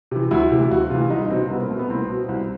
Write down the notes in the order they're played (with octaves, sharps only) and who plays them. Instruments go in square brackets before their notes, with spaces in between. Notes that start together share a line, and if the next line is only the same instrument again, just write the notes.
[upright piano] C3 E3
D2 E4
C3 E3
D2 F#4
C3 E3 F4
C2 D#4
B2 C4
C2 B3
A#3
B2 A3
B3
C2 C4
B2
C2